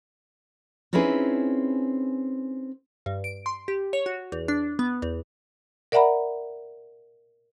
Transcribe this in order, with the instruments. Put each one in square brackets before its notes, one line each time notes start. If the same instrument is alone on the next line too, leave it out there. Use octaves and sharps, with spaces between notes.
[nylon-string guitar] C4 C#4 D#4 E4 G#4 B4
[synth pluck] G2
D7
C6
G4
C#5
F#4
E2
D4
B3
E2
[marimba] A#4 D5 E5 F#5 A#5 B5